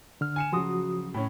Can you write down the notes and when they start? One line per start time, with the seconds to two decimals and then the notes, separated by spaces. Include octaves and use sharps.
0.21 D3 F6
0.36 G#5 C#7 E7
0.52 C#3 F3 F#3 F#4 C6 D#6
1.14 A2 C#4